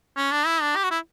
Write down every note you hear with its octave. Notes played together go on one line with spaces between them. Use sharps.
C#4
D4
E4
D4
G4
F#4
E4